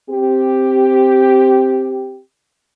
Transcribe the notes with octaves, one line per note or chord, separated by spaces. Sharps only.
C4 G4